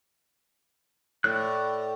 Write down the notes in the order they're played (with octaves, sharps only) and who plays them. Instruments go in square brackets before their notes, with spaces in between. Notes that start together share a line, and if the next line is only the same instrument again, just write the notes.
[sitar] A2 [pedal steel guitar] D5 F#6